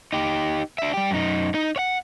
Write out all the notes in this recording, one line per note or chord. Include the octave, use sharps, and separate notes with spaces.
D#4 G4
D4 E5
G3 G4
F#2 D#4
D#4
C#5 F#5